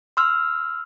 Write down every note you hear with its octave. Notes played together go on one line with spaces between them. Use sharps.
C6 E6 F6